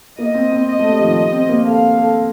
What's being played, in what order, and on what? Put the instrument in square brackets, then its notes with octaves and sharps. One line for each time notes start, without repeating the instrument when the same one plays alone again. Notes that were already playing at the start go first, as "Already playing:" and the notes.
[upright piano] A#3 [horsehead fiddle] D#5
[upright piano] C4
C4
[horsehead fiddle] D#5
[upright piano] A3
G3
F3
D#3
G3
C4
A#3
[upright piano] A4 [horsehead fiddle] F5
[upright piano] A4